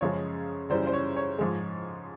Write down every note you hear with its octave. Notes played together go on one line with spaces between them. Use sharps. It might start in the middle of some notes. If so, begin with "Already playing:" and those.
F#2 C#3 F3 G#3 C#5
F#2 C#3 E3 G3 C5
C5
C#5
C#5
G#2 F3 G#3